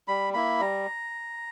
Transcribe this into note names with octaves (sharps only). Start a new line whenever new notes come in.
G3 B5
A#3 E4 B5
G3 A#5